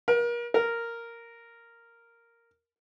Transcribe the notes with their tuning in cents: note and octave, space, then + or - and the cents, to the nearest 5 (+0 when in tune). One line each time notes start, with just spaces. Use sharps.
A#4 +35
A#4 -5